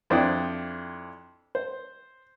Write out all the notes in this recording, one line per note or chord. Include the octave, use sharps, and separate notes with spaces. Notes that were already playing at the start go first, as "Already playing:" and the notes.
F2 D4 E4 C5 G5 D#6
C5